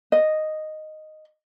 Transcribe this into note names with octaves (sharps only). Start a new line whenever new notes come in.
D#5